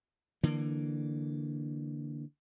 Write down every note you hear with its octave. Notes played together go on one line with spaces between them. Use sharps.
D3 E3 A#3